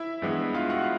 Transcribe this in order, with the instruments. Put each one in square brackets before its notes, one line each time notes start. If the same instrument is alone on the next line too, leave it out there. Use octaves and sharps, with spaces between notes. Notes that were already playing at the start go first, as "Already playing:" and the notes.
Already playing: [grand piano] E4 E5
G2 E3 G#3 B3
F4 F5
F#4 F#5